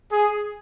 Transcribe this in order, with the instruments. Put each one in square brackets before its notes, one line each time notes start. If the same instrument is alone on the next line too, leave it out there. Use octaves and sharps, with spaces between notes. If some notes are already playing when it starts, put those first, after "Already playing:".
[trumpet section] G#4